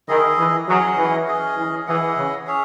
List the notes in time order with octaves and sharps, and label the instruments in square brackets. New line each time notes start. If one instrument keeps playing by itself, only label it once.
[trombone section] D#3 [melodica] E4 G#4 D#5
[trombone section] E3
[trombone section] F#3 [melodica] C#4 G#4 D#5 F#5
[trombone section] E3
[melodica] C#4 G#4 D#5
[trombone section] E3
[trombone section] E3 [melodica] E4 G#4 D#5 F#5
[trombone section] C#3
[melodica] C#4 G#4 C#5 E5